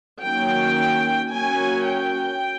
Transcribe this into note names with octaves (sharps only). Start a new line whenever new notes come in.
D#3 F#3 A#3 C#4 G5
F#3 A#3 C#4 G#5
G5